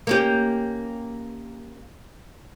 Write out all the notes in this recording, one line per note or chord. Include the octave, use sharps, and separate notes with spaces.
A#3 C#4 G4